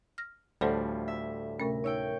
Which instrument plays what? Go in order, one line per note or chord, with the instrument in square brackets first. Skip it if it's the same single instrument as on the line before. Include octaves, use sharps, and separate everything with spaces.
[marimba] F6 A#6
[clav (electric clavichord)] D2 G3 [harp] A2 F3 [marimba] A4 C5 F#5
[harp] E5
[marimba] C3 A3 C#4 [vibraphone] A#4
[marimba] D#4 E6 [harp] C#5 G5